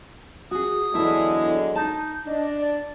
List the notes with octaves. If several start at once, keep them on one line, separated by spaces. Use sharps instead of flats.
F#4 G#4 D#6
E2 D3 F#3 G#3 E4 A5
D#4 A5
D4 D#5
D5